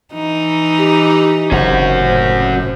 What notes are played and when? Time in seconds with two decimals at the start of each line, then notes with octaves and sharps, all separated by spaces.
0.14 E3 D#4
0.77 G4
1.51 F#1 C3 C#4 F#4 C5
1.97 A2